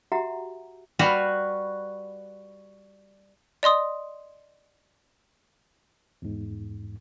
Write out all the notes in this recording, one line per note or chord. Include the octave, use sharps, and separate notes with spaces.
F#4 G4 E5 F#5 A#5
G3 F#4 B4 F5
D5 D#5 C6 D#6
E2 G#2